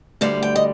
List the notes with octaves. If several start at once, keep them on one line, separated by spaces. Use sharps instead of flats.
D2 D3 G3 F5
G5
D#5